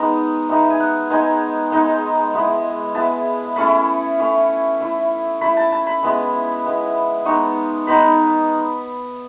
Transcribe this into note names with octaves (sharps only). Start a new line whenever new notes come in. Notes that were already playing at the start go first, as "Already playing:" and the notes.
Already playing: G#3 B3 D#4 D#5
G#3 B3 D#4 E5
G#5
F#5
G#3 B3 D#4 G#5
G#3 B3 D#4
G#3 B3 E4
G#3 B3 E4 A5
A3 C#4 E4 B5
A3 C#4 E4
A3 E4
A3 E4 B5
A5
A5
B5
G#3 B3 E4
G#3 B3 E4
G#3 B3 D#4 C#6
G#3 B3 D#4 B5